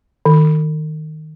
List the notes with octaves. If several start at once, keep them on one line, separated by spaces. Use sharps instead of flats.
D#3